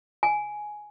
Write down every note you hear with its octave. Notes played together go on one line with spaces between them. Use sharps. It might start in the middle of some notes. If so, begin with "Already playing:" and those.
G#5